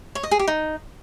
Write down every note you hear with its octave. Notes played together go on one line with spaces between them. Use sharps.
C#5
D#5
G#4
G4
D#4